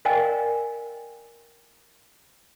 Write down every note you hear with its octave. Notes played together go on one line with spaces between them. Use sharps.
A#4 D5 D#5 F5 G5 G#5